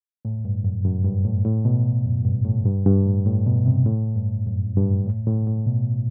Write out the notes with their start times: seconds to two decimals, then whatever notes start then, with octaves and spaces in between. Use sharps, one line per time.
0.25 A2
0.45 G2
0.64 F#2
0.85 F#2
1.05 G2
1.25 A2
1.45 A2
1.65 B2
2.05 F#2
2.25 G2
2.45 A2
2.65 G2
2.86 G2
3.06 A2
3.26 A2
3.46 B2
3.66 C3
3.86 A2
4.16 G2
4.46 F#2
4.77 G2
5.06 A2
5.27 A2
5.47 A2
5.67 B2